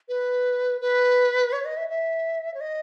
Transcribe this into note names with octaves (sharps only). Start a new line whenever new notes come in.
B4
B4
C#5
D#5
E5
E5
C#5
D#5